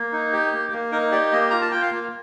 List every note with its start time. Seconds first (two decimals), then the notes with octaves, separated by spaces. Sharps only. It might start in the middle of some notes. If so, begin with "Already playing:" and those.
Already playing: A#3
0.12 D#4
0.33 G4
0.52 A#3
0.72 A#3
0.92 D#4 A#4
1.12 G4 D5
1.32 A#3 D#5
1.50 F4 A#5
1.61 A5
1.71 F4 G5
1.82 F5
1.92 A#3